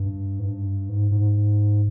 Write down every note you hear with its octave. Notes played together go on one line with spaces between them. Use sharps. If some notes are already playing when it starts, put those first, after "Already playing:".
Already playing: G2
G#2
G2
G#2
G#2